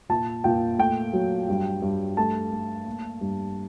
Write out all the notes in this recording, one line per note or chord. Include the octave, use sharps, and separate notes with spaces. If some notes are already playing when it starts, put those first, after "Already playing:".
A#2 A5
A#2 G5
A3 G5
F#3
G2
G2
A3 A5
A3
A#3
G2